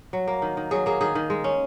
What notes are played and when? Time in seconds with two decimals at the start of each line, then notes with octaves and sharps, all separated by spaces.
0.13 F#3
0.28 A#3
0.42 D#3
0.57 D#3
0.71 F#3 G#4
0.86 A#3 G#4
1.01 D#3 G#4
1.15 D#3
1.30 G#3
1.44 C#4